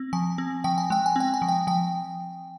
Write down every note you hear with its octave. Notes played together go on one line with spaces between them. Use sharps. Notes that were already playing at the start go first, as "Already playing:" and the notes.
Already playing: C4
F3 G#5
C4
F3 G5
G#5
G#3 G5
G#5
C4 G5
G#5
F3
G5
F3 G5